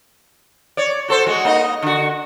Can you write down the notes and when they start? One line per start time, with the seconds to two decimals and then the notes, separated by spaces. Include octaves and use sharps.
0.77 C#5 D5
1.08 F#4 A4 C5
1.27 G#3 F#4
1.45 A#3 D#4 D#5
1.82 D3 F#4